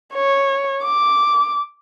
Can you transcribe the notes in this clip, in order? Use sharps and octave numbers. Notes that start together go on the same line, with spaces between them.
C#5
D6